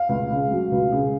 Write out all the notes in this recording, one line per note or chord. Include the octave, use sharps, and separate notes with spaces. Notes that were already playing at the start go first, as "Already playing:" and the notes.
Already playing: F5
C#2
C#3
F#3
C#2
C#3